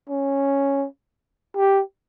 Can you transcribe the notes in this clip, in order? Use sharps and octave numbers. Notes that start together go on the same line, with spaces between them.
C#4
G4